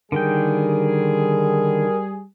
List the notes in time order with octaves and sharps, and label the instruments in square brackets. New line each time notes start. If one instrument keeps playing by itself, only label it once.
[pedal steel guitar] D3 D#3 G5 [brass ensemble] G3 G#4 [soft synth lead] A#4